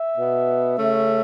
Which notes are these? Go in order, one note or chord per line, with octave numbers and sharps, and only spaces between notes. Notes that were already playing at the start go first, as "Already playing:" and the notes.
Already playing: E5
B2 B3
C#3 A3 C#4